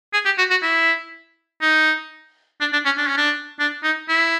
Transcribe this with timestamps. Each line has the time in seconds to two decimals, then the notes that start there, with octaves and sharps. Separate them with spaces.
0.14 G#4
0.25 G4
0.38 F#4
0.51 F#4
0.63 E4
1.62 D#4
2.61 D4
2.73 D4
2.85 C#4
2.98 D4
3.08 C#4
3.17 D4
3.59 D4
3.83 D#4
4.09 E4